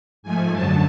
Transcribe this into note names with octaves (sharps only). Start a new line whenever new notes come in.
G#2 F3 A3 G#5
F#2 D3 F#3 A5